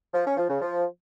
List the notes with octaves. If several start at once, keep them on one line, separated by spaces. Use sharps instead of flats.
F3
C#4
F3
C#3
F3